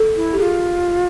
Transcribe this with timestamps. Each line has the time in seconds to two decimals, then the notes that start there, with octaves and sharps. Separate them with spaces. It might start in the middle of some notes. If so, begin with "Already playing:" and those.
Already playing: A4
0.16 E4
0.33 G4
0.39 F4 G#4